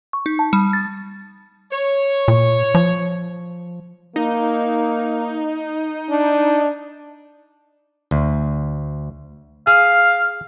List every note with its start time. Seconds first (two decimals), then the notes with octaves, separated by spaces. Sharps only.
0.13 C#6
0.26 D#4
0.39 A5
0.53 G3
0.73 A6
1.72 C#5
2.28 A#2
2.75 F3
4.16 A#3 D#4
6.10 D4
8.11 D2
9.67 G#4 F5